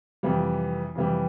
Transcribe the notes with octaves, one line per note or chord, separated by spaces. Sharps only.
F2 C3 E3 G3
F2 C3 E3 G3